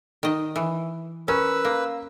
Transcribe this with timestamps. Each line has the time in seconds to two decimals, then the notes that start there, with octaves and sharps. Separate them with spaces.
0.23 D#3 D#5
0.56 E3
1.28 C#4 A#4 B4 E6
1.65 A#3